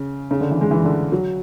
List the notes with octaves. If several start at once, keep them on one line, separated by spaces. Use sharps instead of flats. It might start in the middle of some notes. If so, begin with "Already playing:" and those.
Already playing: C#3
C#3
D3
E3
G#3
E3
D3
F#3